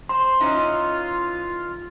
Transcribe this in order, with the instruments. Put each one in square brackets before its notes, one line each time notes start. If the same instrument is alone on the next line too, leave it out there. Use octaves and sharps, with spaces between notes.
[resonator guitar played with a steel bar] C5 [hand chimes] C6
[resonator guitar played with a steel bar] E3 C#4 D#4 [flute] F4